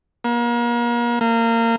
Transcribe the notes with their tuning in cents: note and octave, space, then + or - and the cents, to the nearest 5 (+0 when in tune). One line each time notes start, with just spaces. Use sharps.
A#3 +35
A#3 -25